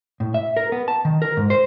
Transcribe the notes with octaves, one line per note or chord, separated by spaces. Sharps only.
A2
E5
A#4
B3
A5
D#3
A#4
G#2
C5